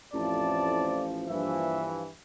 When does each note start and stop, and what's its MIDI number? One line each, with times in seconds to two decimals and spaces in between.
0.14 1.26 33
0.14 1.02 41
0.14 1.02 45
0.14 2.02 53
0.14 1.06 74
0.14 1.02 81
1.29 1.89 34
1.29 2.11 43
1.29 2.11 52
1.29 1.88 76